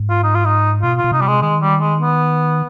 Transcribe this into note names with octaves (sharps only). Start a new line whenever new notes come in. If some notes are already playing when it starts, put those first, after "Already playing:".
Already playing: G#2
F4
D#4
F4
D#4
B2 F4
F4
B2
C3 D#4
G3
G#3
D#3 G#3
G3
G#3
B3